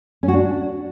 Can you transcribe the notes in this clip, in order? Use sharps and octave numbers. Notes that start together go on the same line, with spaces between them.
C#4
F#4
D4